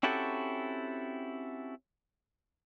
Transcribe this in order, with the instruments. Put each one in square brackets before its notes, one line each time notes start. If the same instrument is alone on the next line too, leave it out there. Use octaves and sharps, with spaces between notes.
[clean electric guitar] C4 C#4 E4 F#4 G4 A4